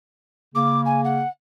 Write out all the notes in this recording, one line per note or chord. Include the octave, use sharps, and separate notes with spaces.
C#3 A#3 D6
G#5
F#5